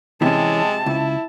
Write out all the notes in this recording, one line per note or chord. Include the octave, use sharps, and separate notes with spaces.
C3 E3 G#3 C#4 A5
C#2 E4